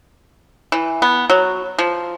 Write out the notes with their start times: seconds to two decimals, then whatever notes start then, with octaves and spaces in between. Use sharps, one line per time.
0.72 E3
1.02 B3
1.30 F#3
1.78 F3